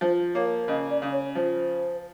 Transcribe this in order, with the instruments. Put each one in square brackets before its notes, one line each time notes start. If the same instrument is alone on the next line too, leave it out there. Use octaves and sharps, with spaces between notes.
[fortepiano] F3 [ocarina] C5
[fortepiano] A#3 [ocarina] C#5
[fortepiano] C#3 [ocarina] D#5
[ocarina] D5
[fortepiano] C#3
[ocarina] C#5
[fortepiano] F3 [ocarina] C5